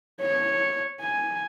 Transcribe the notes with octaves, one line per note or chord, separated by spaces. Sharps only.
C#5
G#5